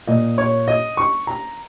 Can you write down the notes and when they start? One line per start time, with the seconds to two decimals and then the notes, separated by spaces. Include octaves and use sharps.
0.07 A#2 D#5
0.38 C#5
0.68 D#5
0.97 C#6
1.27 A#5